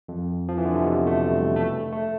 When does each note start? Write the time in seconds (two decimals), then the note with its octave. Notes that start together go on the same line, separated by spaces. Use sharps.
0.08 F2
0.48 F3
0.58 E3
0.65 D3
0.75 C3
0.82 B2
1.07 A3
1.31 G3
1.56 A3
1.92 A3